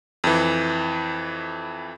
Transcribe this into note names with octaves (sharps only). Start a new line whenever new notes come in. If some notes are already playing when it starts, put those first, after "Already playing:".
F2 E3